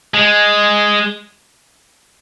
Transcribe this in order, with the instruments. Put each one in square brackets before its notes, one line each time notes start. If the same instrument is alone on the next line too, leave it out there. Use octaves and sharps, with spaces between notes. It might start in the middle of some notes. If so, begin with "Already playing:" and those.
[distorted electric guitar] G#3